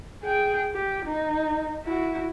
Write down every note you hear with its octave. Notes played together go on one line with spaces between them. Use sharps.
G#4 G5
G4
D#4
E4 F#4